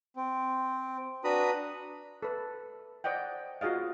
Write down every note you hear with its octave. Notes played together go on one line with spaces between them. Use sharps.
C4
D4 F#4 B4 A#5 B5 D#6
A4 B4
C5 D5 D#5 F#5 G5
F4 F#4 G#4 D#5 F5